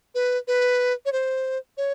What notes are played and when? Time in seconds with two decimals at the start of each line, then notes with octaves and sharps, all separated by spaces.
0.15 B4
0.48 B4
1.06 C#5
1.13 C5
1.77 C#5